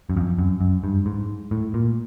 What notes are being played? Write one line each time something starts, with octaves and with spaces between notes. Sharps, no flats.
F#2
F2
F#2
F#2
G2
G#2
A2
A#2